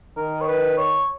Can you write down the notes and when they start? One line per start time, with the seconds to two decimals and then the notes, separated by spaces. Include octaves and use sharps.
0.17 D#3 A#4
0.41 C#5
0.48 B4
0.77 C#5